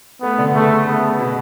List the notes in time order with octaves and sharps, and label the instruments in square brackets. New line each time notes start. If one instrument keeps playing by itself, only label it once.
[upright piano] A3 [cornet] B3
[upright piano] D3
[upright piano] C#3 [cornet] A3
[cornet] B3
[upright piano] B2